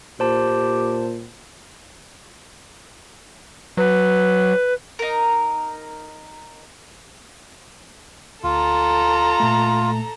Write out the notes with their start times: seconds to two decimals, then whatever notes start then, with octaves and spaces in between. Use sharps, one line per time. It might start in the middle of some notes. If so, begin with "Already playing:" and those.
0.20 A#2 G4 C5 A5
3.77 F#3 B4
4.99 D#4 A#4
8.44 D2 F4 A4 A#5
9.40 A#2 A3